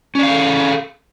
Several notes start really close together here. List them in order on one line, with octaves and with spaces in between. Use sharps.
C#4 D5 F5 G#4 A4